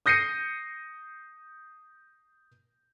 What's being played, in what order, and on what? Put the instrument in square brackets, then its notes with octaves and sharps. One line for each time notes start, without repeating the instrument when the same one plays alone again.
[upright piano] D#6 G6 A#6 C7 C#7 D#7